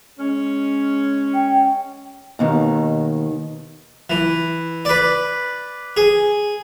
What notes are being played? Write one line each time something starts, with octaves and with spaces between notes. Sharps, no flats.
G#3 C#4
G5
D#2 B2 D#3
E3
B4 D5
G#4